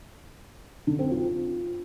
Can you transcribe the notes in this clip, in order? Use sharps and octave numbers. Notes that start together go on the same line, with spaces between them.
D3
C4
F4